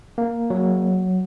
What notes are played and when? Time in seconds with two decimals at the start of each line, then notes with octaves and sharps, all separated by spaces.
0.18 A#3
0.50 F#3